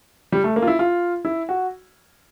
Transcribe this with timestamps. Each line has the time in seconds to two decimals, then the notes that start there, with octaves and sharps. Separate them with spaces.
0.32 G3
0.44 A3
0.56 A#3
0.62 F4
0.67 E4
0.79 F4
1.25 E4
1.49 F#4